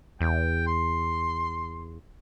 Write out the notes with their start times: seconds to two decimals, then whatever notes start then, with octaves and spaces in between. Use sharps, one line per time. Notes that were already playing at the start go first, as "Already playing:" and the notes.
0.21 E2 G5
0.67 C6